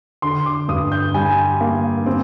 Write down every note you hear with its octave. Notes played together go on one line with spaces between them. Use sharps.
D3 C6
D6
G2 D#6
G6
G3 G#5
A#3
C4